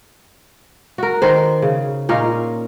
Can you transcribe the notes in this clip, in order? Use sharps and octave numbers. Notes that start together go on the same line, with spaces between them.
F#4 A#4
D#3 D#4 C5
C#3
A#2 C#4 D#4 F5